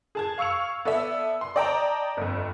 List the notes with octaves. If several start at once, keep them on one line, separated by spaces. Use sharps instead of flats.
G#4 A5 G#6
F5 C#6 E6 C#7 F7
B3 A4 D5 E5
C6
D5 D#5 G5 A5 A#5
G1 F2